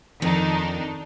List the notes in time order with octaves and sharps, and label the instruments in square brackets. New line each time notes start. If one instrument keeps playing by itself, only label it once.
[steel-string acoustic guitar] F2 [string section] D#3 D4 D#4